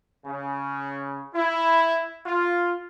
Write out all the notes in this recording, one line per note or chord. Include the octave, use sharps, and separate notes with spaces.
C#3
E4
F4